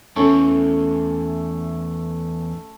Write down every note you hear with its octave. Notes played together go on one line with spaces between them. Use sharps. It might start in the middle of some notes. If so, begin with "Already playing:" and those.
E2 A3 C#4